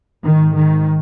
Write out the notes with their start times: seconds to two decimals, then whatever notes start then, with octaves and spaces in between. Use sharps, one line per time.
0.23 G#1 G#2 D#3
0.54 D#3